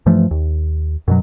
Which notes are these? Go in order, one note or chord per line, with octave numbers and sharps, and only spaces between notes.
G2 E3 F3 A3
D#2
F#2 B2 F#3